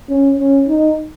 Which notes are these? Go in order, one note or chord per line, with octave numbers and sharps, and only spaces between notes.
C#4
C#4
D#4